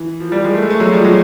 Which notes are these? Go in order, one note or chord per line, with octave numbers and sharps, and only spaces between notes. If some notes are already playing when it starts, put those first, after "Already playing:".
Already playing: E3
F3
F3 G3
G#3
A3
G#3
A3
F#3 G#3
F3 G3
F#3 G#3